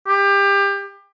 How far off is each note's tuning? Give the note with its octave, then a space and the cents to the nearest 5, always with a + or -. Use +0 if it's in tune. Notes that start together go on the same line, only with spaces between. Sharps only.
G4 +25